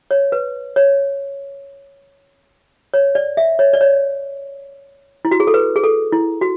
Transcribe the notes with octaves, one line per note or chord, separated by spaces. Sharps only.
C#5
B4
C#5
C#5
D5
E5
C#5
D5
C#5
E4
F#4
G#4
A4
B4
G#4
A4
E4
F#4